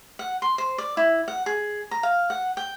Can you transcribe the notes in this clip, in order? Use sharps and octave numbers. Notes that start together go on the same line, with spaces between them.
F#5
C6
C5
D5
E4
F#5
G#4
A#5
F5
F#5
G5